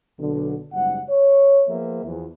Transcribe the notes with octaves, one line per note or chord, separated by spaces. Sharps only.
B1 D3
F#1 G#2 G3 F#5
C#5
F3 A#3 B3 G#4 C5 E5
E2 E3 F3